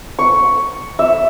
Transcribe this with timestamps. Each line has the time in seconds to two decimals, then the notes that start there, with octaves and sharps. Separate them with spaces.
0.19 C#6
0.99 E5